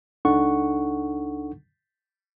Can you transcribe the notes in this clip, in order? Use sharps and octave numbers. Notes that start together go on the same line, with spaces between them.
C#2 D4 D#4 A4 F#5 C#6